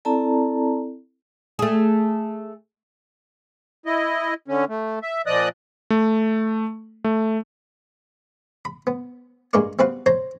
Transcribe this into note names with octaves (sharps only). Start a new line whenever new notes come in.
C4 E4 A4 D5 A5 A#5
A3 G#4
E4 D#5
D3 C#4
A3
E5
A#2 F3 D5 D#5 D#6 F#6
A3
A3
B5
B3
G2 G#3 A#3 A#4 D5 C#6
G3 B3 C4 F#4 B4 F5
C5 C#5 A#5 C6